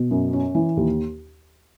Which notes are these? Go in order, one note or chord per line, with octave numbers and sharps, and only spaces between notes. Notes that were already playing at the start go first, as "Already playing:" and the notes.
Already playing: B2
F#2
C#4
E3
D#2